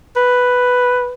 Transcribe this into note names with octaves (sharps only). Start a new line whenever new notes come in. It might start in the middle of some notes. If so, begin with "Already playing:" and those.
B4